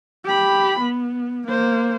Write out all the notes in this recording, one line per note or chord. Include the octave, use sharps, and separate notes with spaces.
G4 B5
B3
A#3 C5